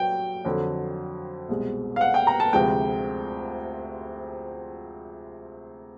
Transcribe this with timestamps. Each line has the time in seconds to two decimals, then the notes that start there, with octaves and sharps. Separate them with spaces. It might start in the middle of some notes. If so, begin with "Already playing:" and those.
Already playing: F#3 A#3 G5
0.45 F2 D3 F#3
1.49 C2 B2 G#3
1.96 F5
2.01 F#5
2.14 G5
2.27 A#5
2.40 A5
2.53 D2 C3 F3 G#3 G5